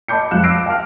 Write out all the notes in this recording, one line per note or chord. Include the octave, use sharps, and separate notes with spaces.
D#5 A5 B5 D6 G6 C#7
F2 G#3 F5 F#6 E7
D6 E6 A#6 C7 D7
F5 A5 D6 F6